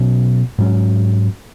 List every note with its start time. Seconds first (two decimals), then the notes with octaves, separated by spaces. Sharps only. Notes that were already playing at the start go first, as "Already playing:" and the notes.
Already playing: B2 F#3 C#4
0.58 G#2 F#3 C#4